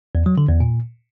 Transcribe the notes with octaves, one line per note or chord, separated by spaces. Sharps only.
E2
F#3
D3
E2
A#2